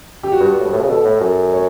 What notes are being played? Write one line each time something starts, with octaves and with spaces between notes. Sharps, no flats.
G4
F#4
G2 G4
A2
G2
A2
C#3
B2 A4
A2
F#2
C#5